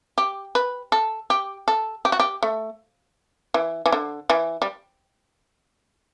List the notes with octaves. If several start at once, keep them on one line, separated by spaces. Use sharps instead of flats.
G4
B4
A4
G4
A4
G4
F#4
G4
A3
E3
E3
D3
E3
G3